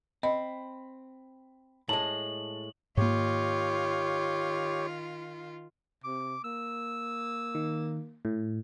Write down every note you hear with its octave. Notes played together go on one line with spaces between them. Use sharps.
C4 D#5 B5
A2 G#3 A5 F#7
G#2 D#3 A#3 F4 G4 C#5
C3 D6
A#3 E6
D#3
A2